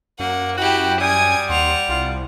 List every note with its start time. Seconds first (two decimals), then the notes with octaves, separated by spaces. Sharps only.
0.20 F#2 A#3 F#5
0.58 E4 F#4 G4 G5
1.01 G3 G#5 D#6 G#6
1.49 D#2 F#5 C6 F7
1.89 C2 F4